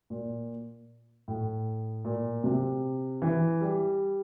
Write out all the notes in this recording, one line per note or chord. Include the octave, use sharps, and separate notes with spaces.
A#2
A2
A#2
C3
E3
G3